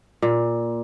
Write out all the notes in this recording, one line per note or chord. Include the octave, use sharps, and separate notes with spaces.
A#2